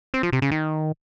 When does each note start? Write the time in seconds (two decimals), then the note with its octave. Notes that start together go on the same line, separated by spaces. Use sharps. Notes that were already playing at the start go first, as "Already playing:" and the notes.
0.14 C4
0.23 F3
0.33 C3
0.42 C#3
0.51 D#3